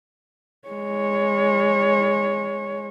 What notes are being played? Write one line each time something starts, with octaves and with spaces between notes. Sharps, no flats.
G#3 C#5